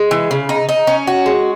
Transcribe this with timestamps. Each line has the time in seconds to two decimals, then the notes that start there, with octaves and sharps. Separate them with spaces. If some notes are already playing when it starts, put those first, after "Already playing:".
Already playing: G#3
0.11 E3
0.31 C#3
0.49 D#4
0.69 D#4
0.87 C#4
1.07 F#4
1.26 G#3